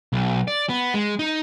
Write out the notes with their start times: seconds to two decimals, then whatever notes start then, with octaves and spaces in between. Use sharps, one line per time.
0.13 B1
0.48 D5
0.69 B3
0.94 G#3
1.19 D#4